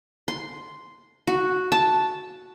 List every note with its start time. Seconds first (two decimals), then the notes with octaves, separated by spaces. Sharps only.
0.28 C6
1.27 F#4
1.72 A5